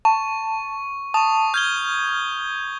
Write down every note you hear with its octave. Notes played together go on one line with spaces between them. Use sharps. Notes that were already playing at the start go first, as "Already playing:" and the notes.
A5 C#6
A5 C#6 D#6
F6 G6 G#6 G7